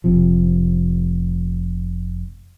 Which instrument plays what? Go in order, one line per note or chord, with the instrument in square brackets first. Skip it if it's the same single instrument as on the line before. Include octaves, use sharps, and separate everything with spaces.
[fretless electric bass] F1 C3 F3